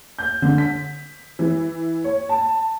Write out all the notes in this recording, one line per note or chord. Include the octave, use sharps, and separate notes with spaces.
G6
D3
B6
E3
C#5
A5